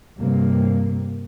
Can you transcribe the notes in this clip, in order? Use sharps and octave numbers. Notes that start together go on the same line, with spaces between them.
G2 C3 G3 A#3